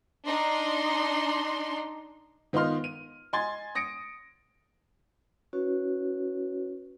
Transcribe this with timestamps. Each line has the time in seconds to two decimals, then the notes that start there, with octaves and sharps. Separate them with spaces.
0.25 D4 D#4 C6
2.53 D#3 B3 F4 D#5 C6 F6
2.84 D#7
3.33 D#5 G#5 C6 G#6 A6
3.75 D#6 A#6 C#7 D7
5.53 C#4 E4 F#4 B4 C#5